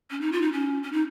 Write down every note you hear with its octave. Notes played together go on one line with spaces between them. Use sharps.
C#4
D#4
F4
D#4
C#4
C#4
D#4